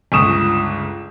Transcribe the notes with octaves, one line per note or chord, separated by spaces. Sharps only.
G1 C#2 C#6 D#6 E7